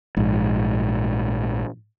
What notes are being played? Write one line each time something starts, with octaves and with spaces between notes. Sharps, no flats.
A#1 G#2